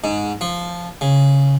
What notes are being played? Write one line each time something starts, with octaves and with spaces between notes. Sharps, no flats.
G#2
F3
C#3